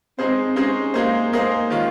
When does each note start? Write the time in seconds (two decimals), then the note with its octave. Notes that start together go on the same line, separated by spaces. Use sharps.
0.18 G#3 C4 D#4 G#4 C5
0.56 G#3 C#4 D#4 G#4 C5
0.94 G#3 A#3 D#4 G#4 C5
1.32 G#3 A#3 D#4 G#4 C5
1.70 D#3 G#3 C#4 F4